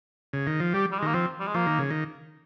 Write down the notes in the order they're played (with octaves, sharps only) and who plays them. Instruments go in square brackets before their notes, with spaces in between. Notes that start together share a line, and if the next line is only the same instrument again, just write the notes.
[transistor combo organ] C#3
D#3
F3
[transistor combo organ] G3 [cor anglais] G4
[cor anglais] G3
G#3
[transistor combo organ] D#3 [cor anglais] A#3
[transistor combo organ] F3 [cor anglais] C4
[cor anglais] G3
G#3
[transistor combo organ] F3 [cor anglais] A#3
[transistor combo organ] D#3
C#3
D#3